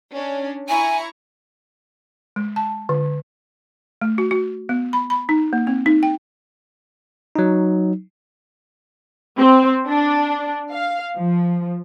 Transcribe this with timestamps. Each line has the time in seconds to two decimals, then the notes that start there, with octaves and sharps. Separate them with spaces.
0.14 C#4 D4
0.69 E4 G#5 A#5 C#6
2.36 G#3
2.56 A5
2.89 D3
4.01 A3
4.18 F#4
4.31 F#4
4.69 B3
4.93 B5
5.10 B5
5.29 D#4
5.53 A#3
5.67 C4
5.86 D#4
6.03 G5
7.36 F#3 D#4
9.38 C4
9.87 D4
10.72 F5
11.16 F3